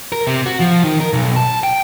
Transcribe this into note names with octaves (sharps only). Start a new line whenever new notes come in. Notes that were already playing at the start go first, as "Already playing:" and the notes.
A#4
C3
F#4
F3
D#3
A#4
B1
A5
G5